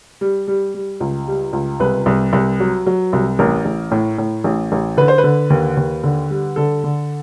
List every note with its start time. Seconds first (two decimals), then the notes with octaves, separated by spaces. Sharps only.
0.21 G3
0.48 G3
0.74 G3
1.00 C#2
1.28 G3
1.53 C#2
1.80 C2 B4
2.06 C2
2.33 C2
2.60 F#3
2.87 F#3
3.13 C2
3.39 A1 A#4
3.65 A1
3.91 A2
4.18 A2
4.44 A1
4.72 A1
4.97 D3 B4
5.08 C5
5.18 B4
5.24 D3
5.50 D#2
5.77 D#2
6.03 D3
6.30 G3
6.56 D3 A4
6.84 D3